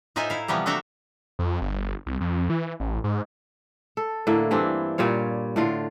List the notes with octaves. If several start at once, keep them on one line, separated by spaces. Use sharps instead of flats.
A2 D#4 F4 C5 E5 G#5
E4 F5
C3 E3 F3 G3 B3
A3 D4 F#4 A4 E5 A#5
F2
G1
C2
F2
E3
A1
G#2
A4
A2 D3 A#3 E4
G2 E3 C4 D4
A#2 G3 F4 C#5
A2 D3 F4